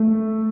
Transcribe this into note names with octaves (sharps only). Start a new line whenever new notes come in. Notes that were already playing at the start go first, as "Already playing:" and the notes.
Already playing: A3